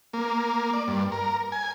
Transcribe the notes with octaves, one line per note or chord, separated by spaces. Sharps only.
A#3
D5
G2
A#4
G#5